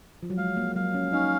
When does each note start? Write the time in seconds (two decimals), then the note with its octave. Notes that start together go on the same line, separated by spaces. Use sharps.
0.23 F3
0.30 F#3
0.37 G#3 F5
0.57 A#3
0.76 F#3 F5
0.94 C#4
1.13 C#4 D#4